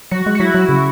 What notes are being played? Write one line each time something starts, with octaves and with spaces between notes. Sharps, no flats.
F#3 F#4
G#3
F#4
F#3 E4
F#3
C#3